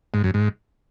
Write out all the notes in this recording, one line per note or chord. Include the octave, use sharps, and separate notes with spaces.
G#2
F#2
G#2